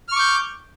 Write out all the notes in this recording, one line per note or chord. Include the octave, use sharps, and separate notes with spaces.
C#6 D6 F6 G6